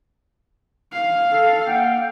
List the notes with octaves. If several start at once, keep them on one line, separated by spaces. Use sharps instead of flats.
F5
A4
A#3 F#5 G5